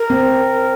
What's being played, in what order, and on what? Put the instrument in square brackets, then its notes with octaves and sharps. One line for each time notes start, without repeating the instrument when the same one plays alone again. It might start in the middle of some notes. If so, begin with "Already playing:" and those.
Already playing: [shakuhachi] A#4
[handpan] C4